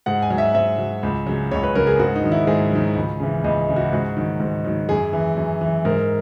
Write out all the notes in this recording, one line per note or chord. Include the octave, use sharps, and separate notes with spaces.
G#2 F#5
G#5
F#3
E5
G#2 E5
F#3
C#2
C#3 F#3
C#2 C#5
B4
C#3 F#3 A#4
G#4
G#2 F#4
D#4
D#3 F#3
E4
G#2 G#4
D#3 F#3
C#2
C#3 E3
C#2 D#5
C#3 E3
F#4
G#2 F#4
D#3 F#3
G#2
D#3 F#3
F#2 G#4
E3
F#2
E3
G#2 A#4